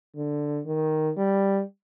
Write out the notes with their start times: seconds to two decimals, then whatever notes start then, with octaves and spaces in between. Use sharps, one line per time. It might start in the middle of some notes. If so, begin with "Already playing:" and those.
0.16 D3
0.66 D#3
1.17 G3